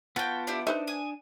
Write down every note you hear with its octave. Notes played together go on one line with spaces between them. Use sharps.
B3 F4 F#4 G5 A5
D4 E4 G4
D4 D#4 B4 C5 E5
G#5 D#6